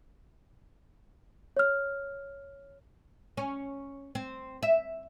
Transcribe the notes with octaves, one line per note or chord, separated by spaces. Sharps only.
C#5 F6
C#4
C4
E5